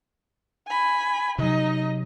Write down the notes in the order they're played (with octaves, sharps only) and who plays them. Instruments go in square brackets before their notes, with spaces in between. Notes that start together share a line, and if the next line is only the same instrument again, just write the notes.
[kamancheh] G#5 B5
[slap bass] C3 F#3 [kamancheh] D#4 D#5